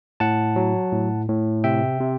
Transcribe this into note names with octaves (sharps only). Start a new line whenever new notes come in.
A2 F#5 A5
F#3
A2
A2
C3 E5 G5
C3